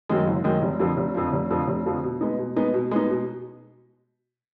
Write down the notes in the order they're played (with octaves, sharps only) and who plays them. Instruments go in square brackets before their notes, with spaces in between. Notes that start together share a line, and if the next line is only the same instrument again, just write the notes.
[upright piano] F#2 D#3 G#3
F#1
F#2 D#3 G#3
F1
F2 D3 F3
F1
F2 D3 F3
F1
F2 D3 F3
F1
F2 D3 F3
B2
G#3 B3 D#4
B2
G#3 B3 D#4
B2
G#3 B3 D#4
B2